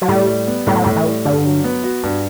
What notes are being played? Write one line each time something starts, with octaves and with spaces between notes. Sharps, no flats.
F#3
A2 G3
G3
B3
A2 G3
F#3
A2 G3
E3
G3
G2 D3
F#3
B3
F#4
G2